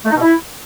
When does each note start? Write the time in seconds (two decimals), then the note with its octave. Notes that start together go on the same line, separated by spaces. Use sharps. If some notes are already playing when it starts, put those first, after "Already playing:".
0.05 A3
0.10 D#4
0.16 B2
0.21 E4